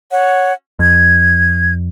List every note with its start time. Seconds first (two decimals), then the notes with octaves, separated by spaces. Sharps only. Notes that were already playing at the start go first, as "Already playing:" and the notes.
0.11 C#5 F#5
0.79 F2 G#6